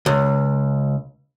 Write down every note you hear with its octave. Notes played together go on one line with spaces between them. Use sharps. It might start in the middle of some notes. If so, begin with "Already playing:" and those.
C#2